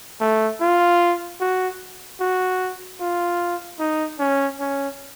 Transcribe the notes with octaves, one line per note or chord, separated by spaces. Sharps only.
A3
F4
F#4
F#4
F4
D#4
C#4
C#4